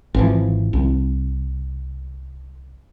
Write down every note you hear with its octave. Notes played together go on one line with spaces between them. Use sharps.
G#1 E3 F3
C2